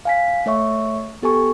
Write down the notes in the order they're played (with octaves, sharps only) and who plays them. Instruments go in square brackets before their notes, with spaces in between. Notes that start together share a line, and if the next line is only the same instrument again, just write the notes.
[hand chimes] F5 G#5 B6
A3 C#5 E5 C#6
B3 G4 A4 G#5 C#6